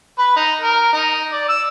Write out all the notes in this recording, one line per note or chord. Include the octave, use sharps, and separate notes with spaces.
B4
D#4
A#4
D#4
D5
E6